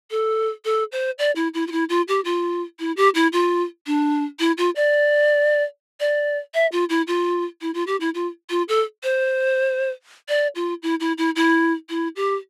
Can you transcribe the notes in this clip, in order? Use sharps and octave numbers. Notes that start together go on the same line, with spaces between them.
A4
A4
C5
D5
E4
E4
F4
E4
F4
G4
F4
E4
G4
E4
F4
D4
E4
F4
D5
D5
E5
F4
E4
F4
E4
F4
G4
E4
F4
F4
A4
C5
D5
F4
E4
E4
E4
E4
E4
G4